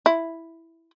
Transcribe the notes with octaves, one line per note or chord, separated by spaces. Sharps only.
E4